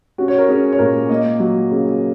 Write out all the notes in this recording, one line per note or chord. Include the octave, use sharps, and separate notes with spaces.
C#4 F#4
C#5
A#4
C#4 G#4
C#5
A#2 A#4
A#3 D#5
F#3
C#3